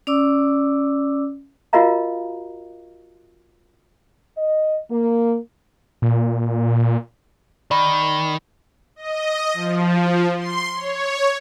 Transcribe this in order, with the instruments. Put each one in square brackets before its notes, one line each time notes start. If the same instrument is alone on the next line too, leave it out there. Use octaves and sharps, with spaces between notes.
[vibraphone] C#4 D5 D6 E6
[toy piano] F4 F#4 A#4 D#5 F5 A#5
[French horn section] D#5
A#3
[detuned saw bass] A#2
[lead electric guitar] D#3 [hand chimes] D5 B5
[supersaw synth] D#5
F3
C6
C#5